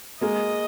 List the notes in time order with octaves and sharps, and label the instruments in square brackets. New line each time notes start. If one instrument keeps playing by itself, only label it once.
[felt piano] G#3 A#3 [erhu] D#5